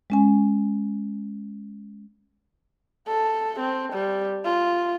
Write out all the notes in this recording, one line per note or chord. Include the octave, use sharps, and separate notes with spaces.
G#3 C#4 G#5
A4
C4
G3
F4